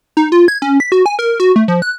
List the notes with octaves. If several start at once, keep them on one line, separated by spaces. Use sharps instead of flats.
D#4
F4
G#6
C#4
B6
F#4
G#5
A#4
F#4
A3
F3
F#6